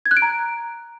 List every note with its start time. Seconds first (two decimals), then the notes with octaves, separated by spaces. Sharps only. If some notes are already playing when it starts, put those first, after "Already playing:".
0.06 G#6
0.11 F#6
0.17 D7
0.22 A#5